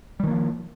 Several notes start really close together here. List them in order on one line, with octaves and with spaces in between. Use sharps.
G3 D#3 A#3 F3